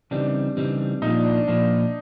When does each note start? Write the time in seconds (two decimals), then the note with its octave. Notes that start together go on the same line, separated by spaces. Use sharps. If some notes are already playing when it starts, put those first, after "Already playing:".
0.11 C#3 E3 G3 C4 D4 D#4
0.57 C#3 E3 G3 C4 D#4
1.02 A#2 F3 A#3 D#4
1.14 D4
1.25 D4
1.36 D4
1.48 A#2 F3 A#3 D4